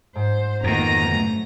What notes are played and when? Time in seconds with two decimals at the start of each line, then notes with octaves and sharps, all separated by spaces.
0.16 G#2 C5
0.64 F2 B2 D#3 A#3 A#5 A#6
1.09 F#2 A3